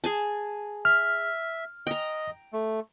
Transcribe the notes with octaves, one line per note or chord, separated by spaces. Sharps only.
G#4 G#5 A5
E5 F6
D#5 G5 A#5
A3